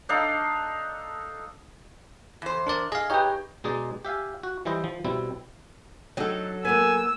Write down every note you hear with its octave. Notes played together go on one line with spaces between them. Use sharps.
D4 D#4 A4 F5
E2 C5
D4 A#4 D5
G#4 D#5 F5
D#4 G4 B4 C#5 G5
B2 G#3 D#4 G#4 D5
G4 E5 F5 G#5
F#4
E3 G3 E4 C5 D#5
F3
B2 G3 C4 E4
F#3 D4 D#4 A4
A#3 B3 B4 G#5 E6